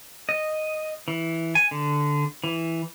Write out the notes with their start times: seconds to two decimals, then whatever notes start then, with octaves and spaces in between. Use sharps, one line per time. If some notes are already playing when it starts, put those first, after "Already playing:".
0.29 D#5
1.08 E3
1.55 G#5
1.71 D3
2.44 E3